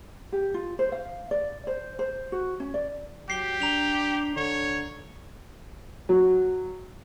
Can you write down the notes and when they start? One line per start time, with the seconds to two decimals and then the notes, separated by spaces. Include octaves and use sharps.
0.32 G4
0.54 F4
0.79 C5
0.92 F5
1.31 D5
1.67 C5
1.99 C5
2.32 F#4
2.60 C#4
2.74 D5
3.30 F#3 G4 C7 G7
3.60 D4 A#5 F7 G7
4.36 D3 C#5
6.09 F#3